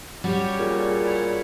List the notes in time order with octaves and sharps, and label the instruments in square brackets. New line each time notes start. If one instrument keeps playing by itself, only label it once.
[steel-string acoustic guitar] G3 C#4 F#4 [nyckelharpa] G4 C#5
[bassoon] A#2 [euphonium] G#4
[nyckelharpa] E4 C#5